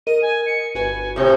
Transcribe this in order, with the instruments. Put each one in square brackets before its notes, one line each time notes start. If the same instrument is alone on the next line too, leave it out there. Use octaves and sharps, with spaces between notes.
[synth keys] A#4 D#5 [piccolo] D#7
[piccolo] G#5
C#7
[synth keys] G1 F#4 B4 [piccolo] G#5
[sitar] A2 C3 [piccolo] G6